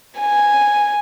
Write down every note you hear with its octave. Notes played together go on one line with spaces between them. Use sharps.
G#5